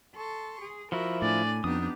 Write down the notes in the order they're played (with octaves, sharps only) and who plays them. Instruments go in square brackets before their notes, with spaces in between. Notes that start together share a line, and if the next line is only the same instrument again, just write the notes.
[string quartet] A4 C6 C#6
G#4
[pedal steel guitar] F3 E4 [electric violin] F#4 [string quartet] A#4 E5 A#5
[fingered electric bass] A2 [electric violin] D4 D5 [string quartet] G#5
[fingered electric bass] F2 [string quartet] B3 D#4 G4 [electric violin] D4 [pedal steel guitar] D#6